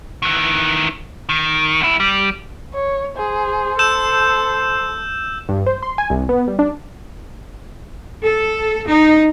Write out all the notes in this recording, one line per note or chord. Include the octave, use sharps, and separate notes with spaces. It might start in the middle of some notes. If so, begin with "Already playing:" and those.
D#3 E3
D#3
D2 E4
G3
C#5
G#4 C5
A4 E6 G6 E7
G2
C5
C6
G#5
C2
B3
G3
D4
A4
D#4